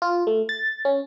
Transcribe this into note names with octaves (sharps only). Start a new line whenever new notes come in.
F4
A3
A6
C#4